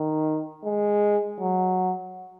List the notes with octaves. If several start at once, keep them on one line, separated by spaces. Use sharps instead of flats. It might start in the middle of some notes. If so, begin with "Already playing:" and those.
Already playing: D#3
G#3
F#3